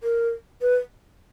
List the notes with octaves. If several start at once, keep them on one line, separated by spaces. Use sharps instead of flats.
A#4
B4